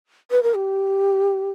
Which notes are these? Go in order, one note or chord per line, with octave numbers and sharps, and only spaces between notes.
B4
A#4
G4